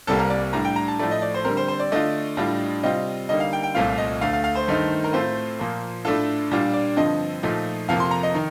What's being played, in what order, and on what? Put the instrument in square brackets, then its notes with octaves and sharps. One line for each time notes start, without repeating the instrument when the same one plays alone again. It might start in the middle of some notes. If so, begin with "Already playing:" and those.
[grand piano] C2 C3 G3 A#3 A4
A#4
D5
A2 G3 D4 A#5
G5
A#5
A5
A2 F3 A3 D5
D#5
D5
C5
D3 G3 C4 A#4
C5
C5
D5
D3 A3 D4 F4 D#5
A2 G3 D4 F4
C3 G3 C4 F4 D#5
D3 G3 A#3 D#4 D#5
F5
G5
G5
C2 A#2 A3 C4 F4 F5
D#5
D2 D3 A3 F5
F5
F5
C5
G2 D#3 A3 D#4
A#4
A2 A3 C4 F4 C5
A#2 F3 A#3
A2 A3 D4 F4 A4
A#2 G3 D4 F4
D5
G2 D3 F3 C4 D#5
A#2 F3 A3 D#4
F2 C3 F3 A#3 F4 F5
C6
A#5
D#5
D#3 D#4